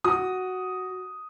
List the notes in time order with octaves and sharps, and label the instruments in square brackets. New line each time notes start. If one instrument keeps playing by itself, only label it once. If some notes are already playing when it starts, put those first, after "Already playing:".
[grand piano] F#4 D#6